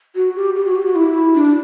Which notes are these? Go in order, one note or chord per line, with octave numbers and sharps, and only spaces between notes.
F#4
G4
G4
F#4
G4
F#4
E4
D4